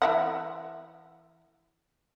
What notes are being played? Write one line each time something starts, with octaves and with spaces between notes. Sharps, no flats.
E3 E5 F#5